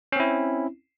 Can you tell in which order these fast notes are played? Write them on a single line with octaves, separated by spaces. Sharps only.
C#4 C4 E4